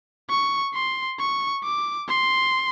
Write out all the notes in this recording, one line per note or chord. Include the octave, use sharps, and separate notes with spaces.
C#6
C6
C#6
D6
C6